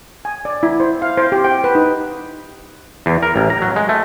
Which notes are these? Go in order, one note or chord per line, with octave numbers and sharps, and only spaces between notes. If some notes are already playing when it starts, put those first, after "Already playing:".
G#5
D5
E4
C5
F5
C5
G4
G5
B4
D#4
E2
A#4
A1
A#5
F#3
G#3
A3